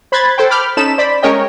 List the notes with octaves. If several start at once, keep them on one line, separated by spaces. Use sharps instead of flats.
C5 B5 C6 F#6 G#6 A6
A4 C5 G5
B5 D6 F6 G6
C#4 D#4 A4 B5 E7
C5 D5 B5
G#3 C#4 A#4 C#5 D#5 G5